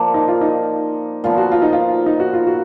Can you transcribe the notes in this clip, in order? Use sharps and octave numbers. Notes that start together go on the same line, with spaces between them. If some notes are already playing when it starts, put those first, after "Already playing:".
Already playing: F3 A#3 D4
D#4
F4
D#4
A#2 F3 B3 F4
F#4
F4
D#4
F4
D#4
F#4
F4
F#4